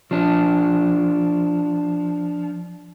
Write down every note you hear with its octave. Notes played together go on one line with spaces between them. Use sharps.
F3 D4